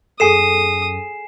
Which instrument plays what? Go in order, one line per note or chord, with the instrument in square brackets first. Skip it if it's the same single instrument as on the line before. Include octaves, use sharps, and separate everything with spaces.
[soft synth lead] F#2 [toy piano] G#4 A4 [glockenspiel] G#5 C7 E7 [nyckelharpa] D#6